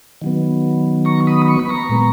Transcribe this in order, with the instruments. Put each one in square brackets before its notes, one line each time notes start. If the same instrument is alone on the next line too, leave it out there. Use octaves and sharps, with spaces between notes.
[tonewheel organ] D#3 F#3 B3
A#5 C#6
B5 D#6
C#6
B5
A#5 C#6
A#2 G#3 B3